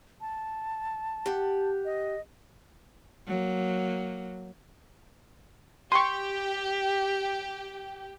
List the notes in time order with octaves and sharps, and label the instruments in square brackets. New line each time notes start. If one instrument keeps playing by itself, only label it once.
[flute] A5
[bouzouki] G4 F#5
[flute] D#5
[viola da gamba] F#3 A#3
[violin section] G4 [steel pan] C6 C#6